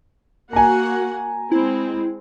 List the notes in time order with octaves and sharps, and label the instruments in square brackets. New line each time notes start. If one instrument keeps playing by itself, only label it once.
[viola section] A#3 F#4 F#5 [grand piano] G#5 A#5
[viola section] G#3 C4 [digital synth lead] E4